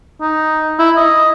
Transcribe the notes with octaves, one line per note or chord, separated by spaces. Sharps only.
D#4
E4
D#5